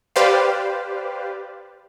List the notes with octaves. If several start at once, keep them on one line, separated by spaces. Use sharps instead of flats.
G4 B4 C5 D5 F5